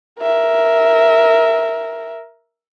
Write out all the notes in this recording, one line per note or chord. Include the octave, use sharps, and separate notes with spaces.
A#4 E5